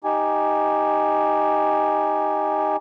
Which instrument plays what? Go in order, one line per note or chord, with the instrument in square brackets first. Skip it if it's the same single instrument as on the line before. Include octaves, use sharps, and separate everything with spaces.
[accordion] D#4 G4 G#5